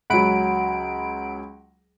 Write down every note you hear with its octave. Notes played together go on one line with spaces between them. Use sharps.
C#2 F#3 F#5 B5 D7